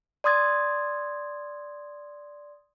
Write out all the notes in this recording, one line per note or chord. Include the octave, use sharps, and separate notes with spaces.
D5 C6 D#6 G#6 A6